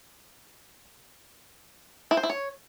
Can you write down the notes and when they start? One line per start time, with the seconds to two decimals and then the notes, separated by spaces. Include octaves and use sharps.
2.11 E4
2.17 C5
2.23 E4
2.30 C#5